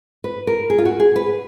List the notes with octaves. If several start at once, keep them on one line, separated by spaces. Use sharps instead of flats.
B4
A#4
G#4
F4
F#4
G#4
B4